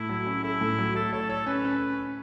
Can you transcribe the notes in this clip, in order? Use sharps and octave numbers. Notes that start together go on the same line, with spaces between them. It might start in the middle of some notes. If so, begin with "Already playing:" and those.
Already playing: A2 A3 E4
F#3
C#4
E4 A4
A2
F#3
A3 A4
A4 C#5
A4 C#5
C#4 B4
C#4